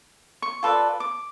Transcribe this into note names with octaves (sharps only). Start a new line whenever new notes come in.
C#6
F4 A4 B4 D5
D6